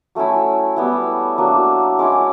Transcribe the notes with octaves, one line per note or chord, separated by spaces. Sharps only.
F#3 A3 C#4 E4
G3 B3 E4
F#3 A#3 D4
G#3 C#4 E4 D6